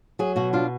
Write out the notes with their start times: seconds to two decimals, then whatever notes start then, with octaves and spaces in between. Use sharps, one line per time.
0.19 F#3 G#4
0.36 B2 F#4
0.53 D4 F4